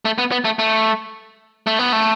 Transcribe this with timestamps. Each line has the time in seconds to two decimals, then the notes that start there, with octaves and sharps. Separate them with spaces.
0.05 A3
0.18 B3
0.31 B3
0.45 A3
0.59 A3
1.67 A3
1.79 B3
1.92 A3